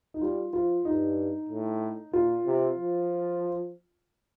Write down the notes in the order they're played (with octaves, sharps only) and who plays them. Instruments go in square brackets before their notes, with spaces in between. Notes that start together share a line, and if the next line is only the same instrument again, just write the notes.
[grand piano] D#4
[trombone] G3 [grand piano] F4
[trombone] F3 [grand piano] F4
[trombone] G2 [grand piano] D#4
[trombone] A2
[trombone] A#2 [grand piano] F4
[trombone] C3
F3